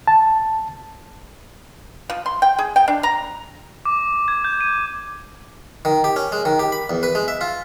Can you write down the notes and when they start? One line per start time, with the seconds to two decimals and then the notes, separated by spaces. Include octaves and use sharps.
0.07 A5
2.10 F3
2.26 C6
2.42 G5
2.58 G#4
2.76 G5
2.88 D4
3.03 A#5
3.85 D6
4.28 G#6
4.44 G6
4.61 D#7
5.85 D#3
6.04 G4
6.16 C#4
6.32 G#3
6.45 D#3
6.59 G4
6.72 B5
6.90 E2
7.03 B4
7.15 G#3
7.28 E5
7.41 F4